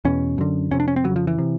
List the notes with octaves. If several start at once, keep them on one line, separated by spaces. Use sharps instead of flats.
E2 B2 C#4
F#2 D3
F2 C3 C#4
D4
C#4
C4
F2 C#3 F#3
F3
E3
C3